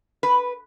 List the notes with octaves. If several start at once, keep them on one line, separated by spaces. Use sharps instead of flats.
B4